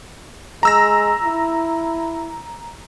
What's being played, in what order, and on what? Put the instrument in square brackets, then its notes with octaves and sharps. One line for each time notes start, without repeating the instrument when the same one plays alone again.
[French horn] G#3 [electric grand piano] A#5 E6 A#6
[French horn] E4